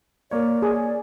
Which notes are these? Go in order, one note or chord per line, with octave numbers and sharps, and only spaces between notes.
A#3 C#5 D5
G#4